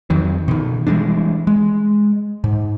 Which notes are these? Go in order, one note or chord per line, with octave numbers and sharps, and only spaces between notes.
F2 D#3 F#3
B2 D#3
E3 G3 G#3 D4
G#3
G#2